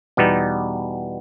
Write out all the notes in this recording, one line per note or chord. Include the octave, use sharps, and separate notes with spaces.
E2 B2 G3 B3 D#4